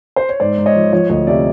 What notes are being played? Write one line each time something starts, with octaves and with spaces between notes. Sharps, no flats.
C5
C#5
G#2 C5 D5
G#2
C#5 D#5
F3
F3 C#5 D#5
D2 C#5 D#5
C3 D5 E5